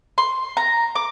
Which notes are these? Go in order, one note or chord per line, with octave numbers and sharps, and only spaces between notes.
C6
A#5
D6